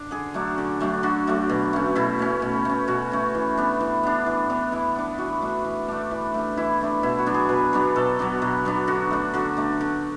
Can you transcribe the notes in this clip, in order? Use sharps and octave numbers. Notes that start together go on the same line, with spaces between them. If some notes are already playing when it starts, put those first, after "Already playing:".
Already playing: D4
D3 G#4
F#3 A3 D4
D3
F#3 A3 D4
D3 F#4
F#3 A3 D4
B2
A3 C#4
B2 E4
A3 C#4
B2
A3 C#4
B2 F#4
A3 C#4
E3
B3 D4
E3
B3 D4
E3
B3 D4
E3 E4
B3 D4
E3 F#4
A3 D4
E3
A3 D4
E3
A3 D4
E3 E4
A3 D4
B2 E4
F#4
F#3 B3 D4
G#4
B2 B4
F#3 B3 D4
B2 A4
F#3 B3 D4
B2
F#3 B3 D4
D3 F#4
A3 D4
D3 F#4
A3 D4
D3